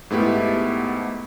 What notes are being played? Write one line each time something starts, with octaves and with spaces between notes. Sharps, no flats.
G#2 A3 B3 E4 G4